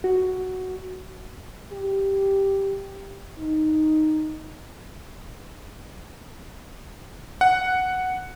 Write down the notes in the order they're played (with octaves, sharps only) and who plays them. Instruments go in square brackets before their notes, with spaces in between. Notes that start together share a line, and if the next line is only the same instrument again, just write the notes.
[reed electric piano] F#4
[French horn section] G4
D#4
[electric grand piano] F#5